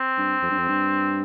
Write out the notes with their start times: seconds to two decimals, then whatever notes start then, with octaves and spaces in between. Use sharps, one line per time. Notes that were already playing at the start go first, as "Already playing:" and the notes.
Already playing: C4
0.18 G2
0.43 F2
0.51 G2
0.58 F2
0.69 G2